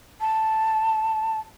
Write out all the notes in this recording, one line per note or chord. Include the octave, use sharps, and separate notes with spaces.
A5